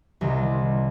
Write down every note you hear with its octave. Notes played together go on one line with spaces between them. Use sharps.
C2 C3 D#3